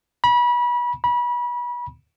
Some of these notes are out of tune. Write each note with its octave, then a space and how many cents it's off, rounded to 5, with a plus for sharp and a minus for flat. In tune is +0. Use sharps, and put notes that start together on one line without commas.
B5 -30
B5 -30